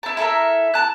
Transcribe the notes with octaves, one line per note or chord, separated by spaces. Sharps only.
E4 A5
E4 A4 A#4 E5
A5 F#6